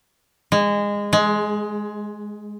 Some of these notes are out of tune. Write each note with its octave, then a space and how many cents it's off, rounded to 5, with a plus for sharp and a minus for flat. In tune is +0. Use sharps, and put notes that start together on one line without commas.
G#3 -20
G#3 +15